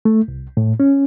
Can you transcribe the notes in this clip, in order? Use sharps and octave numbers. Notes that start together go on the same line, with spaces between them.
A3
C2
A2
C#4